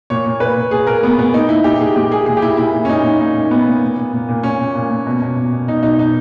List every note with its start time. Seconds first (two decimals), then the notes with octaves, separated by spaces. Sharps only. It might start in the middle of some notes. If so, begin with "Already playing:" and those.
0.10 A#2 C#5
0.26 A#2
0.40 A#2 B4
0.56 A#2
0.71 A#2 G#4
0.87 A#2 A#4
1.03 A#2 B3
1.18 A#2 B3
1.33 A#2 D#4
1.49 A#2 E4
1.64 A#2 G4
1.80 A#2 G#4
1.96 A#2 G4
2.11 A#2 G#4
2.26 A#2 G#4
2.37 G4
2.42 A#2 E4
2.57 A#2 E4
2.73 A#2
2.85 C#4
2.88 A#2 D#4
3.04 A#2
3.19 A#2 D#4
3.36 A#2
3.50 A#2 B3
3.67 A#2
3.82 A#2
3.97 A#2
4.13 A#2
4.29 A#2
4.43 A#2 C#4
4.60 A#2
4.75 A#2
4.90 A#2
5.06 B2
5.22 B2
5.36 B2
5.53 B2
5.68 B2 D#4
5.83 B2 D#4
5.98 B2 D#4